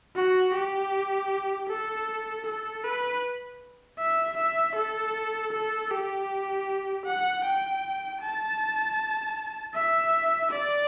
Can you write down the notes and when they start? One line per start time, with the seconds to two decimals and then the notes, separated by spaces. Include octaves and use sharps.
0.15 F#4
0.54 G4
1.69 A4
2.46 A4
2.84 B4
3.99 E5
4.37 E5
4.76 A4
5.53 A4
5.91 G4
7.06 F#5
7.44 G5
8.21 A5
9.74 E5
10.51 D5